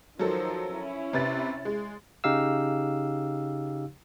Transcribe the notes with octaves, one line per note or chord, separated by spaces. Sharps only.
D#3 F3 F#3 A4 C5
C#4 E4
C3 B4 A6
G#3
C#3 D#4 G4 F5 E6